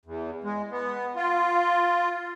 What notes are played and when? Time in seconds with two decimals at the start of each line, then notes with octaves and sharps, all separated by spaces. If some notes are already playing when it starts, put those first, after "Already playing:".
0.06 E2
0.44 G#3
0.71 B3
1.16 F4